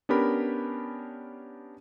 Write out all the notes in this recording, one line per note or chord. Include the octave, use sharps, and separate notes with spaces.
B3 C#4 D4 G4 A#4 B5